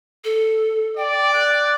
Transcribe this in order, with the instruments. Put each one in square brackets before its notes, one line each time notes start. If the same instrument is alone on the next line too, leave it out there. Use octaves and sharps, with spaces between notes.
[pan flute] A4
[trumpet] D5 [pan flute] G5
[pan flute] F#6